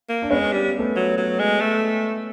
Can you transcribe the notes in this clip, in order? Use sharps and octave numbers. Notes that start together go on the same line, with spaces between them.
A#3
D4
G#3 B3 C#4
G3
A3 B3
F#3
F#3
G#3
A3